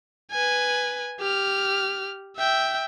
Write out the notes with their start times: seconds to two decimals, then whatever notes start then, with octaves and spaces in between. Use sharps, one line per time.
0.31 B4 G#5
1.20 G4 F6
2.37 E5 G5